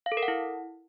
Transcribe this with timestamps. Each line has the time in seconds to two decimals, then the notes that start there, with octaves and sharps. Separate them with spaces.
0.06 F5
0.12 A4
0.17 A#4
0.23 F#5
0.28 E4